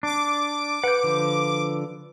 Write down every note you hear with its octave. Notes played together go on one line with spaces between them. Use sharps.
D4 D6
B4 F#5 G6
D3 F3